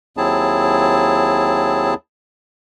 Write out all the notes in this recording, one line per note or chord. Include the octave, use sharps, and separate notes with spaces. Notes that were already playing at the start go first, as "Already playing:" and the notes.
D#2 F#3 C4 E4 G#4 A5